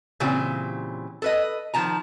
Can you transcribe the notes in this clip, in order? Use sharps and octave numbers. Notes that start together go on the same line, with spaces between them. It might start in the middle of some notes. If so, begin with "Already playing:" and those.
A#2 C#3 E3 C4 G4
A4 B4 D#5
D#3 F3 A5 A#5